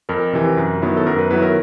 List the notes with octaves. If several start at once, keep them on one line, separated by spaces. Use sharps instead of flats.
F2 A#4
C3 E3
F#2
D#3 F#3 B3 E4
A4
F#2 A#4
B4
D#3 F#3 B3 E4 B4
A#4